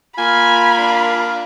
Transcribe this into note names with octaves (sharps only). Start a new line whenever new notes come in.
A#3 F4 G#5 B5
D4